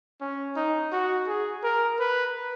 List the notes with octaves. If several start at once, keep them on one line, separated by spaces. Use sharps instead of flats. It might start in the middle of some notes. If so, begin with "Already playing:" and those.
C#4
D#4
F#4
G#4
A#4
B4